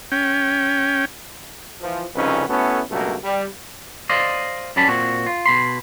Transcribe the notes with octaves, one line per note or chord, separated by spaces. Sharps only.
C#4 G5
E3 F3
C2 F2 C#3 C#4 D#4 B4
A3 B3 C#4 E4 F#4 A4
C#2 G2 B2 F#3 A3 A#3
G3
C5 D5 D#5 F5
F#2 F#3 G3 C#4 A5 B5
A#2 C4 F#4
F4
B2 B5 C6